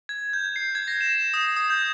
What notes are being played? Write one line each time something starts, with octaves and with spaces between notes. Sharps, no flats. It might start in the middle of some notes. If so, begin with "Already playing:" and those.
G#6
G6
C7
G#6
A#6
E7
D#6
D#6
G6